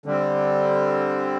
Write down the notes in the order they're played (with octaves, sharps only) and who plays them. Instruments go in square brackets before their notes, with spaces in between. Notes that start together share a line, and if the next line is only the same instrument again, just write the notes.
[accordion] D3 G3 C4